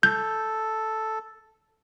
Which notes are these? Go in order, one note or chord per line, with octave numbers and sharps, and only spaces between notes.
A4 G6